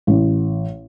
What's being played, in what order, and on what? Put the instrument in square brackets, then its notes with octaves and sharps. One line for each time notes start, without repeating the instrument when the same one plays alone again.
[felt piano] A1